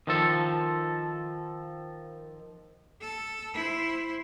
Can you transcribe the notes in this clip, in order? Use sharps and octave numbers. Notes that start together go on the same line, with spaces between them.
D#3 F3 A4
A4
E4 C5